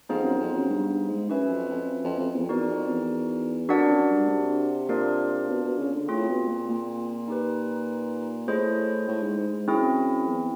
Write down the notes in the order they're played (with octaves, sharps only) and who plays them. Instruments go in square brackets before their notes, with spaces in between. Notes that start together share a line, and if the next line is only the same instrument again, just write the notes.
[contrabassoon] F2 [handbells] B3 D#4 G#4 C5 F5
[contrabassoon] F#2
F#2
F2
F#2
G2
G2
G#2
[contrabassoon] F#2 [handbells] C#4 F#4 B4 E5 G#5
[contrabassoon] F2
F2
F2
F2
E2
F2
[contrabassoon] E2 [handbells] D#4 F#4 A#4 D5
[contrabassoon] F2
E2
[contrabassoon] F2 [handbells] D4 F#4 A#4 D5 F#5
[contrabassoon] F#2
G2
C3
[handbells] A#3 D4 F4 A#4 D5
[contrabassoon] B2
B2
C#3
D3
[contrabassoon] A2 [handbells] C4 F4 G#4
[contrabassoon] B2
A#2
A#2
[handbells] D#4 G4 B4
[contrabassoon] A2 [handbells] E4 G#4 C5 D#5
[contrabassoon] A2
G#2
G#2
G#2
[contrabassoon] F#2 [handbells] C4 E4 G#4
[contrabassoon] E2